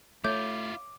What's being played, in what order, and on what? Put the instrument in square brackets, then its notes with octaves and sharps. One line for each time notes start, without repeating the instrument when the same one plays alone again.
[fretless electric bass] A3 [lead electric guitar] E4 F4 [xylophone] C#5 E5 G6 [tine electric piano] D6